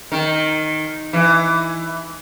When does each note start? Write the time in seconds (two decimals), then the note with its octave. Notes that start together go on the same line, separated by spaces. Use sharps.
0.12 D#3
1.13 E3